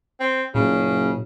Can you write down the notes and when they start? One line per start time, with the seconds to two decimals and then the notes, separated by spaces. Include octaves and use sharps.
0.20 C4
0.55 F#1 A#2 C#3